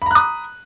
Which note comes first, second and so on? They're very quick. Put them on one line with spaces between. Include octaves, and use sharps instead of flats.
B5 A#5 F#6 D#6